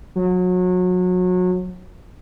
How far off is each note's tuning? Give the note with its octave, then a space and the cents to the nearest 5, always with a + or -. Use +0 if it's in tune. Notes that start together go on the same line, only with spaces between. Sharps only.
F#3 -30